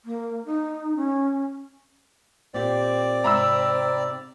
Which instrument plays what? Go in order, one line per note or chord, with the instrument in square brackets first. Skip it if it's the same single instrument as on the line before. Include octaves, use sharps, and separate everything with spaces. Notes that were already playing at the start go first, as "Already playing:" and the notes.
[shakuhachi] A#3
D#4
C#4
[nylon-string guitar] A#2 G4 [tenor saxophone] C4 [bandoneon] D5
[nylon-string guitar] G#2 C3 E5 [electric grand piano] A#5 B5 E6